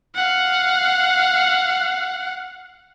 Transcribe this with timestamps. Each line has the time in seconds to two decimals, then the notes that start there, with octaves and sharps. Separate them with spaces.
0.15 F5 F#5